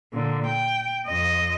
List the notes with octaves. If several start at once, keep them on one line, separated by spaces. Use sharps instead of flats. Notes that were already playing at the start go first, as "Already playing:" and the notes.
A#2 D3
G5
F2 D#5